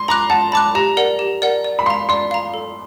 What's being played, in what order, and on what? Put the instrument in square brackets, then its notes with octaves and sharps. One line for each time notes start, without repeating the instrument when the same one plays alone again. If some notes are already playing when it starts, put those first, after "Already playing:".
Already playing: [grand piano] C6
[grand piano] A#5 [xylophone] B5 D6 F#6
[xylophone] F#5 [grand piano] A5
[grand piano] A5 [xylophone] B5 D6 F#6
[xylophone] G4 [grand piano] A#5
[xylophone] A#4 D5 F#5
G4
A#4 D5 F#5
D5
[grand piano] B5
[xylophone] F5 A#5 [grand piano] C6
[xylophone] D5 [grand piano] C6
[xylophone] F5 A#5
A4